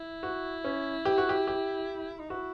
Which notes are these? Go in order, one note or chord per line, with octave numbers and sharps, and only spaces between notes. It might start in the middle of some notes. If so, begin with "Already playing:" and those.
Already playing: E4
F#4
C#4
G4
F#4
G4
G4
D#4
E4 F#4